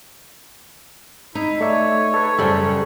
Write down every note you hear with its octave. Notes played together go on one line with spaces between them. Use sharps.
D#4 E4
A3 C#5 D5 E5
A4 B4
F#2 C#3 G3 A4 C5